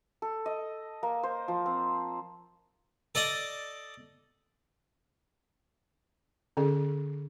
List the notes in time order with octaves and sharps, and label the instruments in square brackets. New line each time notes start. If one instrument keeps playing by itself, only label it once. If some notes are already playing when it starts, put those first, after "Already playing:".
[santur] A4
D#5
A#3
C5
F3
C4
[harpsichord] A4 D5 D#5
[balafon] D3 C#4 G#4